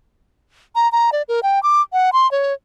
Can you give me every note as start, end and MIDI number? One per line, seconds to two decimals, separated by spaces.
0.75 0.90 82
0.92 1.10 82
1.12 1.22 74
1.28 1.40 70
1.43 1.62 79
1.63 1.82 86
1.93 2.10 78
2.13 2.30 84
2.31 2.53 73